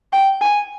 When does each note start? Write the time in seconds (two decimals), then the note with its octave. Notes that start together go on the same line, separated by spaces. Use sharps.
0.13 G5
0.41 G#5